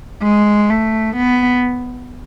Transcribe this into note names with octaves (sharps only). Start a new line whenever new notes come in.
G#3
A3
B3